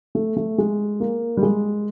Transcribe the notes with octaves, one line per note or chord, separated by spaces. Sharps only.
A3
A3
G#3
A#3
G3
G#3